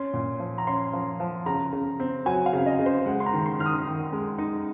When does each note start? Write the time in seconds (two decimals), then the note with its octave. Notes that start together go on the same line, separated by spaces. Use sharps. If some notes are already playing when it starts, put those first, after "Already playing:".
Already playing: C#4 C6
0.14 A#2
0.39 F3
0.58 A#5
0.67 C#4 C6
0.93 F3
1.20 F3
1.46 C#3 A#5
1.73 C#3
2.00 C4
2.26 F#3 G#5
2.46 F5
2.53 C#3
2.66 D#5
2.79 C#3
2.86 C5
3.06 G#3 F#5
3.20 C6
3.26 A#5
3.33 D#3
3.46 C6
3.59 D#3 F6
3.66 D#6
3.86 D#3
4.13 G#3
4.38 D#4